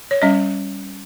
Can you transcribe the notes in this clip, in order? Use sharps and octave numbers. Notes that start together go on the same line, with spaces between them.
C#5
G3 C#4 D#5